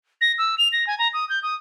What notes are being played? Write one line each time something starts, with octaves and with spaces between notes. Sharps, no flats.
A#6
E6
F7
A#6
G#5
A#5
D#6
G6
D#6